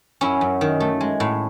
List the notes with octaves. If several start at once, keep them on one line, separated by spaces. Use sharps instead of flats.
F#2 C#4 E4
F#2
D#3
A3
G#3
A2